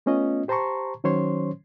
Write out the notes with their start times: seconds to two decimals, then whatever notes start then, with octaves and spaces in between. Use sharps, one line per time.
0.06 A3 B3 C#4 F4 D#5
0.48 G4 C5 A5 A#5 C6 C#6
1.04 D#3 F#3 C#4 C5 C#5 C6